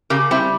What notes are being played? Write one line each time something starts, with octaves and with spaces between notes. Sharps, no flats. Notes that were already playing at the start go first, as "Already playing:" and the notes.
C#3 G4 A#4
G3 C4 E4